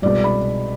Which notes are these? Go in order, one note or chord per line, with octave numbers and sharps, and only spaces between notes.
C2 B2 G#3 D5
B5